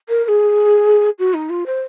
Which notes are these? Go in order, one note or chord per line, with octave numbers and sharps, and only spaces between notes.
A#4
A#4
G#4
F#4
D#4
F4
C5